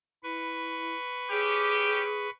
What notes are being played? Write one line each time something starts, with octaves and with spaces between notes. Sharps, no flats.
E4 B4 C#6
C#4 G4 G#4